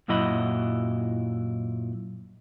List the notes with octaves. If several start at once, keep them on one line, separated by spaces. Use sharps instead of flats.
F#2 A#2 F#3 E4 D#5 B5